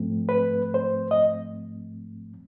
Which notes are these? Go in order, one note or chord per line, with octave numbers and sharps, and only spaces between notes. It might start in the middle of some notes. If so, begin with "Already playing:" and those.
Already playing: G#2 F3 A3 C4
B4
C5
D#5